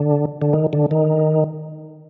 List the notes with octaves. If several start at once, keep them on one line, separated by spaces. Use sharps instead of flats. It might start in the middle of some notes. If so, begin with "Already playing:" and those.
Already playing: D3
D3
D#3
D3
D#3